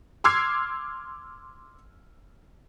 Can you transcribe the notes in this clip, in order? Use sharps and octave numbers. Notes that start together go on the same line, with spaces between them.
C6 D6 E6 F6 G#6 C7